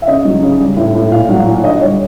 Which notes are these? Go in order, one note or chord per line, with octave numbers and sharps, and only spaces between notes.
E5
C#3 D#5
F#3
C#3
G3
A2
A2
A#2 F5
F#3 F#5
F5
A#2
D3 D#5
G3 C#5